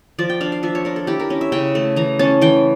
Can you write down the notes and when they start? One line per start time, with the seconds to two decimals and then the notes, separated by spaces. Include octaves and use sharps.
0.19 F3 D5
0.30 G5
0.41 D4 F5
0.52 F5
0.63 F3 E5
0.75 C#5
0.85 D4 A#4
0.96 A4
1.07 E4 G4
1.20 A#4
1.30 C#4
1.41 E5
1.52 C#3 G5
1.75 A3
1.96 E3 A#5
2.19 C#4 A5
2.41 E3 G5